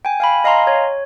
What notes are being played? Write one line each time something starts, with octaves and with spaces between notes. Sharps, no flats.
G5 G#5
F5 G#5 B5
D#5 F5 G#5 A#5 C6
C#5